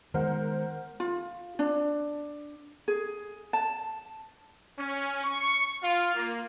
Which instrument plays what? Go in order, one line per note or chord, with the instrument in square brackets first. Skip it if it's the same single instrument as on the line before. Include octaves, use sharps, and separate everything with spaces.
[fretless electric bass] D#3 G#3 B3 [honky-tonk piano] A#4 C5 F#5
[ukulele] F4
D4
G#4
A5
[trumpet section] C#4
C#6
F4
A#3